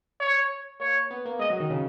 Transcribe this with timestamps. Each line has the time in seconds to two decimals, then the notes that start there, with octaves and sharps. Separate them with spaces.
0.20 C#5
0.80 A#3 C#5
1.11 B3
1.25 A#3
1.39 G#3 D#5
1.50 F#3
1.60 D#3
1.70 C#3